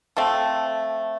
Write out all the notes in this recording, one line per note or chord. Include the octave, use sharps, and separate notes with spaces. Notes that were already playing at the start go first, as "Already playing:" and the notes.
F3 A3 C4